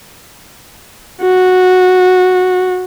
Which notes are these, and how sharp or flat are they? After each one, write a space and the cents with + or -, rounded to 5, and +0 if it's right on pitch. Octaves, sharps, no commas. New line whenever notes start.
F#4 -10